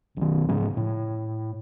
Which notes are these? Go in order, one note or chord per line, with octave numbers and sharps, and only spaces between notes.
B1 D#3
G#2 C#3 F3 C#4
A2